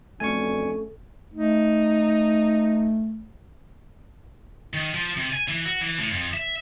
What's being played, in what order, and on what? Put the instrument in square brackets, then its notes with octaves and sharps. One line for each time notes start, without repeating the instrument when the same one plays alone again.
[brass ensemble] F2 B2 D4 [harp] A3 C#4 [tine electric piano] G#5 C#6
[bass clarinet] A3 [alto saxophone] D#4
[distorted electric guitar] D#3
F3
C3
G#5
E3
F#4
E3
A2
F2
E5